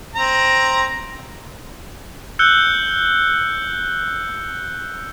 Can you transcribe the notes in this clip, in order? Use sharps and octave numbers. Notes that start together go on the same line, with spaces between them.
C4 A#5
E6 F#6 G6 C#7 G7